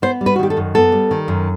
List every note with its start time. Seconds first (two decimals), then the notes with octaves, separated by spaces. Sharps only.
0.02 B3 C5
0.21 G3
0.26 B4
0.36 F#4
0.39 D#3 G4
0.50 A4
0.57 F#2
0.75 B3 A4
0.92 G3
1.11 D#3
1.28 F#2